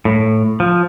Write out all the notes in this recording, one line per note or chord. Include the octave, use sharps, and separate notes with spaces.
A2
F3